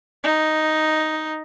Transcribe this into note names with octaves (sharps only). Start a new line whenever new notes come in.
D#4